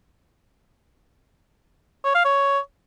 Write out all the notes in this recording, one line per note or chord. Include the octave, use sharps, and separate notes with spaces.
C#5
F5
C#5